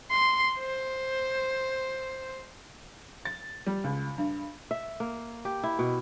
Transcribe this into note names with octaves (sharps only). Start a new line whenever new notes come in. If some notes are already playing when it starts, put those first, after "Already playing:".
C6
C5
A6
G3
C#2
G2
E5
A#3
G4
E4
B2